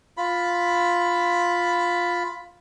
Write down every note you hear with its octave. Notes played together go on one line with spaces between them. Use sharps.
F4 B5